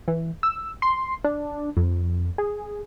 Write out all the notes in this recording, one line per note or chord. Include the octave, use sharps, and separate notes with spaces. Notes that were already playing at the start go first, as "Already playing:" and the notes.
E3
E6
C6
D4
F2
G#4